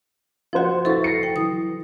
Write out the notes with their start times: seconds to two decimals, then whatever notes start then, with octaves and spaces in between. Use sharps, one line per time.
0.53 F3 F4 F#4 C5 F#5
0.85 E4 A4 B4 C#6 A6
1.04 A#6 C7 C#7
1.23 G5
1.36 E3 F#3 D#6